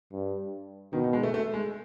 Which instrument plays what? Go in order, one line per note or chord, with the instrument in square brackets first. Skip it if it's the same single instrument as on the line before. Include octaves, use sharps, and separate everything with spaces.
[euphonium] G2
[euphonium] B2 [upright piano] D#3
[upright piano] D#3
G#3
A3
A3
G#3